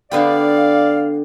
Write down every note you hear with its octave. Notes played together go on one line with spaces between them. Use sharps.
D3 B3 G4 D5 F5